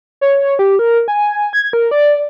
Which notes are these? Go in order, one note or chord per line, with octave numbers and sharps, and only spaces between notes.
C#5
G4
A#4
G#5
G#6
A#4
D5